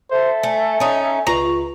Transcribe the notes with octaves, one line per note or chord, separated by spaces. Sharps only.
A4 C5 E5
A3 G#5
C#4 D#4
C#2 F4 B4 A#5 C#6